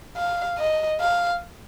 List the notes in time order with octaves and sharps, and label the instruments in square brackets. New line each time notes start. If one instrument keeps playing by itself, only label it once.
[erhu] F5
D#5
F5